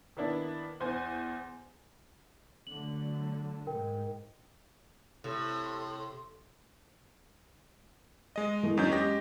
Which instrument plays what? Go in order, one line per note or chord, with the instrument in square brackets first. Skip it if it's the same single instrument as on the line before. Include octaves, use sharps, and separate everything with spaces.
[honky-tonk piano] D#3 A#3 B3 D4 E4
E2 C5 G#5
[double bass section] D3 F#3 A3 [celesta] F#7
[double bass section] G#2 [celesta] A#4 G5
[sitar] A2 [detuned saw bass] C3 [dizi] A4 [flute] C6
[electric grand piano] G#3 D#5
[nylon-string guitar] E3 A3 A#3
[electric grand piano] E2 F#3 G6 [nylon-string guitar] C#4 D#4
[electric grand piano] G#3 G4 A#6